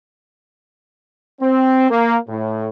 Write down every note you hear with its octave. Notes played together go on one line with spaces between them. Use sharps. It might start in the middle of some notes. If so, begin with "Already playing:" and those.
C4
A#3
A2